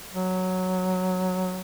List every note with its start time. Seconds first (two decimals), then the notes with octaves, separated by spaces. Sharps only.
0.13 F#3